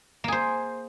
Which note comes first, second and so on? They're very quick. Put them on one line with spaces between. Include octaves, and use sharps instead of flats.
A#3 G#4 C5